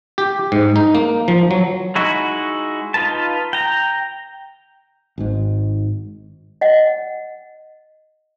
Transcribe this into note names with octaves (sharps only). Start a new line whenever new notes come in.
G4
G#2
D#4
A#3
F3
F#3
G#3 D#4 E4 F#4
D#4 F4 B4 A5
G5 A#5
G#1 G#2
D#5 F#5